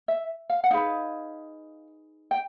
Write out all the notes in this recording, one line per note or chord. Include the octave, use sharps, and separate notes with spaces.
E5
F5
F#5
D#4 G#4 B4 F5
G5